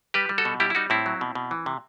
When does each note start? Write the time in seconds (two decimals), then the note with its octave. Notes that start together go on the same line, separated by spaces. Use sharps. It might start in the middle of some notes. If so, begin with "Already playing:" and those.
0.14 G3 G4 B4
0.29 G3
0.38 F#4 A4
0.45 B2
0.60 G3 E4 G4
0.70 E4
0.75 G3 D#4 F#4
0.90 A2 C4 E4
1.06 F#3
1.21 B2
1.35 B2
1.51 E3
1.66 C3